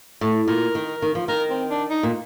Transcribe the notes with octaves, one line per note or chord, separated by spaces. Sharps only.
A2
A#2 A#4
D#3
D#3
F3
D#3 A#4
C4
D4
D#4
A#2